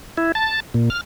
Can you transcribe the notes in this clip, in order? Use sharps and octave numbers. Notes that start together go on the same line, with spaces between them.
E4
A5
A#2
F6